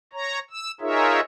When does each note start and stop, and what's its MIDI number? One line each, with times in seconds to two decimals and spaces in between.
0.13 0.39 73
0.13 0.39 82
0.50 0.71 88
0.81 1.20 63
0.81 1.20 65
0.81 1.20 68
0.81 1.20 70
0.81 1.20 73
0.81 1.20 76